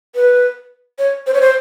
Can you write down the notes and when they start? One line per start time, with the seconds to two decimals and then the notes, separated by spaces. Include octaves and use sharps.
0.15 B4
0.99 C#5
1.27 C5
1.34 C#5
1.41 C5